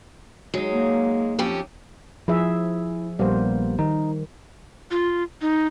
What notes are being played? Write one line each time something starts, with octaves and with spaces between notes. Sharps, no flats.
F#3 G#3 D#4
A#3
F2 C#4 G4
F3 E4 G#4 E5
A#1 G3 A#3 B3 C5
D#3 D#4
F4
D#4